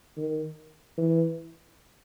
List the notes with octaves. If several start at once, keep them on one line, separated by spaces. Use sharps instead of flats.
D#3
E3